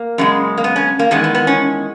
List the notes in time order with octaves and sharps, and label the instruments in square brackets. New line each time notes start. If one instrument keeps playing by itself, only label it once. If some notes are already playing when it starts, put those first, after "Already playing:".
Already playing: [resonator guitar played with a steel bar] A#3
F#2 C#3 G#3
A#3
B3
C#4
A#3
E2 D#3 G#3 B3
B3
B3
C#4